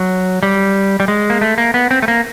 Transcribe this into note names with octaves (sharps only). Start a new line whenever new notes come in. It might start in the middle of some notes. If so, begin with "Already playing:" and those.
Already playing: F#3
G3
G3
G#3
A#3
A3
A#3
B3
C4
A3
A#3